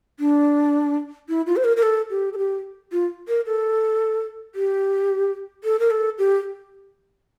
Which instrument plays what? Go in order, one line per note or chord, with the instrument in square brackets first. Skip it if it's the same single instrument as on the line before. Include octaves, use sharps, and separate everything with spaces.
[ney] D4
E4
F4
C5
A#4
A#4
A4
G4
A4
G4
F4
A#4
A4
G4
A4
A#4
A4
G4